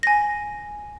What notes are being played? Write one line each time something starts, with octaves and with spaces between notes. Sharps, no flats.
G#5 A#6